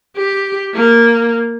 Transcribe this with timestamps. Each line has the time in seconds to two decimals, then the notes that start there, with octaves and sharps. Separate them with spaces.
0.17 G4
0.75 A#3